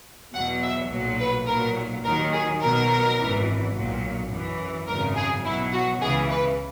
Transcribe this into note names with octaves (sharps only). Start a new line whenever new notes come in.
E2 B2 F#3 F#5
E5
B1 A#2 F#3
B4
B1 A#2 F#3 A#4
D#2 D#3 F#3 A#4
G#4
B1 B2 F#3 A#4
G#1 F#2 E3
B1 A#2 F#3
F#2 E3
G#1 F#2 C#3 A#4
G#4
B1 B2 F#3 E4
F#4
C#2 C#3 E3 G#4
B4